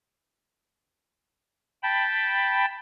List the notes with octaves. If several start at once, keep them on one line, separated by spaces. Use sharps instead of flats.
G5 A5 B5